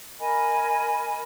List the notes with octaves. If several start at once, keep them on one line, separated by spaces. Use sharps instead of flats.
A#4 D#5 G#5 B5